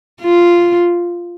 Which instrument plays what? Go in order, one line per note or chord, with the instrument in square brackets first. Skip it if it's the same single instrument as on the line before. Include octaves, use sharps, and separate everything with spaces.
[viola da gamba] F4